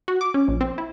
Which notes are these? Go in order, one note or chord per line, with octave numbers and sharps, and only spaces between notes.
F#4
D6
C#4
A#1
C4
E4